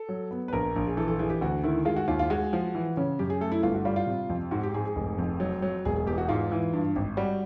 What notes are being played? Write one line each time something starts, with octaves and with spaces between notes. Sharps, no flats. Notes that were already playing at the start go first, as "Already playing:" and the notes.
Already playing: A4
F#3
B3
B4
A#1 A#4
A#1
G#4
E3 A4
A4
E3 G#4
G4
D2 F#4
D#3 E4
G#3 F4
F#4
D#2 F4
F4
G#3 F#4
F3
E3
C#3
F#2 G4
G#4
A3 A4
E4
G1 F4
F#4
G3 F4
F4
C3
F2
G#2 F#4
G4
G#2 G#4
G#4
F1
F2
F#3
F#3
E1 G#4
G#4
E2 G4
F#4
G#2 F4
E3
G2
G#1
G3 F#4